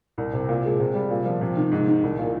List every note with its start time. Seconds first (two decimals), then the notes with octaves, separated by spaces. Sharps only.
0.18 C2
0.33 C3
0.49 A#2
0.65 G#3
0.80 C3
0.95 G3
1.10 A#2
1.26 F3
1.41 C3
1.57 D#3
1.72 G#2
1.88 D#3
2.03 C2
2.19 A#2